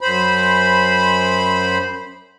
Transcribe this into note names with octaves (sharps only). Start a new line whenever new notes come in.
F#2 C5 B5